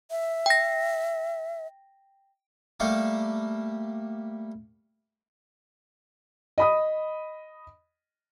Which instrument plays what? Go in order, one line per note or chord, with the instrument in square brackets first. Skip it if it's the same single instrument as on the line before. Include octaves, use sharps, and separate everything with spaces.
[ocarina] E5
[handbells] G5 A#6
[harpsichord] G3 A3 A#3 A4
[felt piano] D#5 B5 D#6